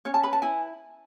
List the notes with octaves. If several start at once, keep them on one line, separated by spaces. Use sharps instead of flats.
C#4 C#5
A5
B4 B5
A5
E4 G#5